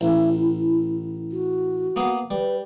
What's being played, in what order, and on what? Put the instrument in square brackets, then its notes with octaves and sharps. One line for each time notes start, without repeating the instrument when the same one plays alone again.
[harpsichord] A1 [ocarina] E5
[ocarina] E4
F#4
[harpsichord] A#3 B3 G#4
[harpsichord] G3 [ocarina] B4